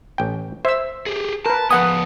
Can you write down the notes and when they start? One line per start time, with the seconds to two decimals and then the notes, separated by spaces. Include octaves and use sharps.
0.18 A1 G5
0.65 C5 E5 E6
1.06 G4 G#4
1.46 A#4 B4 A5
1.71 F3 B3 B4 F#5 G#5 D#6